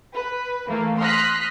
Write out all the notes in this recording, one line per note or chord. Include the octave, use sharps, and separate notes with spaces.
B4
E3 A3 A#3
C6 D#6 F6 F#6 A#6 B6